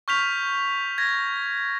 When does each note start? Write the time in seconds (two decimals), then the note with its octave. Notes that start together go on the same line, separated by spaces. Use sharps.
0.08 C#6 F6 G6 B6 F7
0.98 G#6 A#6